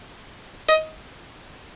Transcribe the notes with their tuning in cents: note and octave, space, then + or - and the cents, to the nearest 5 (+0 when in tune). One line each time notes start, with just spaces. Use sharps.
D#5 +15